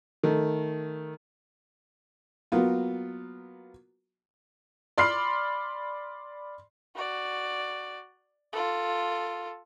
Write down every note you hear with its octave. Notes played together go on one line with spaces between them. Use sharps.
D#3 A3
F#3 A#3 B3 F4
D5 B5 C6 D6 F6 C7
F#4 D5
F4 A4